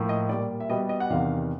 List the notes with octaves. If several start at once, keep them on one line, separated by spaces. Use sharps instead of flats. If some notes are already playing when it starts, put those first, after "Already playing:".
Already playing: A2 F3 A#3
D#5
A#2 G3 A#3 D5
E5
B2 G3 B3 D#5
D#5
F#5
E2 C3 D#3 F5